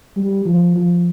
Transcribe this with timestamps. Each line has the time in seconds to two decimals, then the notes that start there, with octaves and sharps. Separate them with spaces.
0.16 G3
0.46 F3
0.76 F3